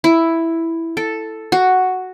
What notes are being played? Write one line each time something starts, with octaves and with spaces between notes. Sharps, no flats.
E4
A4
F#4